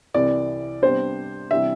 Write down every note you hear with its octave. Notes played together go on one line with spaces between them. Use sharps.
C2 C3 E3 D5
C3 G3 B3 D4 C5
C3 E3 G3 D4 E5